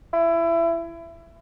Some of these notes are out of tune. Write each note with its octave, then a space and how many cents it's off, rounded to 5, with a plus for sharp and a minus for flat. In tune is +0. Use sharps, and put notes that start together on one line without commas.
E4 +25